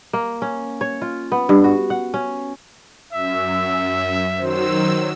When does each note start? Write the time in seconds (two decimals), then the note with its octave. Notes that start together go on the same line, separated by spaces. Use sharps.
0.13 A#3
0.42 C#4
0.81 C#5
1.02 F4
1.32 B3
1.49 G2
1.64 F#4
1.90 F#5
2.14 C#4
3.13 F#2 E5 E6
4.39 D#3 F#3 C5 E6